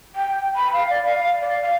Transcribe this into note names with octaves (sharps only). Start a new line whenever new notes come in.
G5
B5
F5
D5
F5
F5
D5
F5